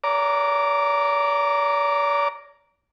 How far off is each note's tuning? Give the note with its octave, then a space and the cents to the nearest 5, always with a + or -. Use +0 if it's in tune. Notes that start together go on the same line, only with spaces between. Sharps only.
D5 -45 A#5 +0 D6 -5